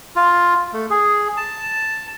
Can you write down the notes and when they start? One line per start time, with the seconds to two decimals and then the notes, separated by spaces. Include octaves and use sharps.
0.16 F4
0.73 A3
0.90 G#4
1.37 A5